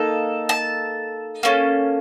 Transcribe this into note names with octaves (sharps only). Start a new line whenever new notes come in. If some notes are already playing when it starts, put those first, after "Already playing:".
Already playing: A#3 D#4 A4
A5
A#3 C#4 A4